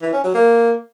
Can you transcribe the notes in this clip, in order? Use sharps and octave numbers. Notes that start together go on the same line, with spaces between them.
E3
C#4
F#3
A#3